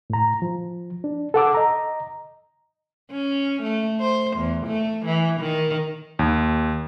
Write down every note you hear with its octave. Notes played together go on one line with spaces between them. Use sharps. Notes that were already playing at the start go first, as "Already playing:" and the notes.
A2 A#5
F3
D4
A4 F#5 D6 E6
D#5 A#5
C#4
A3
C5
E2
A3
E3
D#3
D#2